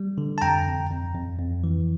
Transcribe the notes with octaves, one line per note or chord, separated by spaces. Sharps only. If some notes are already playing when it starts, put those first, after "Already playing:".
Already playing: G3
D3
A5
F2 G5 A#5
F2
F2
F2
F2
E3